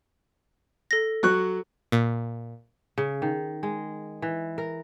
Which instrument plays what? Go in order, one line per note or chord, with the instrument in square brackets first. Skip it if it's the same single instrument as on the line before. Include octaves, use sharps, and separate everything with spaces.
[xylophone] A4 A#6
[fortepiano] F#3 C#6 F#6
[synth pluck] A#2
[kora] C#3
D#3
G#3
E3
A#4